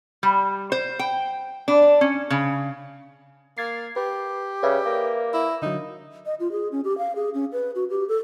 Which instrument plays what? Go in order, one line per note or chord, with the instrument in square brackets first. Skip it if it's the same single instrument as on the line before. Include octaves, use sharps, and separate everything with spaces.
[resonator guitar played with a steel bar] G3
C5
G5
D4
C#4
C#3
[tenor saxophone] A#3 [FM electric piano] G#6 A6 C7
[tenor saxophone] G4 [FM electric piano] B4
[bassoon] C#3 [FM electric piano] B4 D5 E5
[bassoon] A#3
[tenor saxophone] E4
[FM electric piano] D3 F#3 [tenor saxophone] D#4
[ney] D#5
F4
G#4
C#4
G4
F5
G#4
C#4
B4
F#4
G4
A4